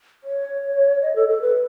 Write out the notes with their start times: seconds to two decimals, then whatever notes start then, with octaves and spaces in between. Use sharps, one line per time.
0.24 C#5
1.02 D#5
1.16 A4
1.29 A4
1.42 B4